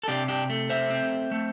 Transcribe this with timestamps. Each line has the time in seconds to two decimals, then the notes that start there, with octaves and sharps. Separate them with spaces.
0.03 A4
0.08 C3 D4 G4
0.28 D4 G4
0.50 A3
0.70 C5 E5
0.90 C4
1.31 A3